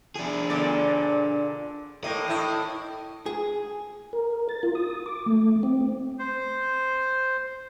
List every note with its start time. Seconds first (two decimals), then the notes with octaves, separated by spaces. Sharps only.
0.16 D4 G#4
0.50 A#2 D3 D5
2.04 A2 A#3 D#5
2.28 A2 E4
3.26 G#4
4.13 A#4
4.49 A6
4.63 F4
4.75 D#6
5.06 D6
5.26 A3
5.63 C4
6.19 C5